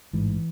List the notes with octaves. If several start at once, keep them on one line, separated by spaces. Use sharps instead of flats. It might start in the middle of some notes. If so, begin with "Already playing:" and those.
A1 G#2 E3